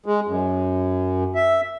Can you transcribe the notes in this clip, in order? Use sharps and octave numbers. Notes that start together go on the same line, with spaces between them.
G#3
F#2
E5